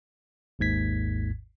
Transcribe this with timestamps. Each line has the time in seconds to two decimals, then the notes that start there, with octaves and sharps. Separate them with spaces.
0.59 G#1 D#2 G#2 G#6 B6